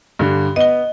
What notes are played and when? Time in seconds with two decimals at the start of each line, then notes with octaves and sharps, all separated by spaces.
0.19 G2 D3
0.56 B3 D#5 G7